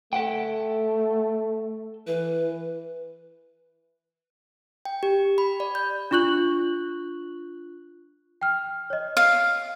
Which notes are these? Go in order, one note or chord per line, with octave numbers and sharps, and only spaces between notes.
A3 A4 F#5 G5
E3 B4
G5
G4
B5
D5
G6
D4 F4 C#6 F#6 F#7
G5 F6
C#5 D#5
F5